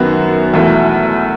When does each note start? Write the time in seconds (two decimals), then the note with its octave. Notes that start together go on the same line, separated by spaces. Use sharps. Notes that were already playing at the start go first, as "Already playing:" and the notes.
Already playing: F#2 D#3 F#3 B3 F#4
0.54 E2 B2 A3 E4